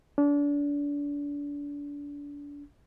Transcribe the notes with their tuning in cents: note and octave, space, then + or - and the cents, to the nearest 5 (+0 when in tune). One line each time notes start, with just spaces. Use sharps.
D4 -30